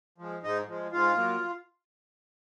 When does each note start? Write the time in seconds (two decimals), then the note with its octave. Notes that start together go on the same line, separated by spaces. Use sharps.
0.18 F3 G#3
0.43 G#2 D#4
0.67 F3 G#3
0.92 G#2 F4
1.17 F#3 A#3